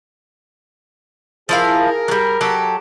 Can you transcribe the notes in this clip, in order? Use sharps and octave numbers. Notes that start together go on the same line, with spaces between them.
F3 E4 G#4 A#4 F5
F#3 G3
F#3 G4 A4